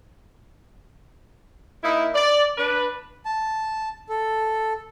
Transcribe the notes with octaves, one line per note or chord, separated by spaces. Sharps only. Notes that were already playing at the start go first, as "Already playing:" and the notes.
A#3 D#4 E4
D5
D4 B4
A5
A4